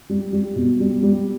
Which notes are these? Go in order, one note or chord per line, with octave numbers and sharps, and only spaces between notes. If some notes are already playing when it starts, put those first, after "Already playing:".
G3
G3
B2
G3
G3